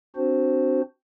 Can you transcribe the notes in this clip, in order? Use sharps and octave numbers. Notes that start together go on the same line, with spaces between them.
C4 D4 F#4 C5